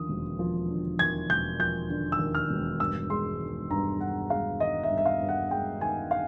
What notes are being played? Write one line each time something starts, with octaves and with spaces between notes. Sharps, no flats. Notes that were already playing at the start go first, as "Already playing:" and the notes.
Already playing: D#2 D3 F3 D#6
E1
F3
D3
D#2 G#6
E1 G6
F3 G6
D3
E6
D#2
F6
E1
G2 E6
G#3 C6
D#3
G2 A#5
G2 F#5
G#3 F5
D#3 D#5
E5
G2
E5
F5
G2
F#5
G#3 G5
D#3 G#5
F5